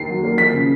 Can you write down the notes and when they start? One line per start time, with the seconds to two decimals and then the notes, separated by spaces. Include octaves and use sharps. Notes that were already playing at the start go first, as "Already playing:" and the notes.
Already playing: D#2 C7
0.09 F#3
0.23 A#3
0.38 F3 B6
0.53 C#3